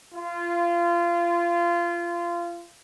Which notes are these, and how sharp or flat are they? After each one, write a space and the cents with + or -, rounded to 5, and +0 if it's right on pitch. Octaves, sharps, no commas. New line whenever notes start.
F4 -25